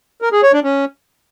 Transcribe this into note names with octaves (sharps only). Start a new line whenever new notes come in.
A#4
G#4
C#5
D4
C#4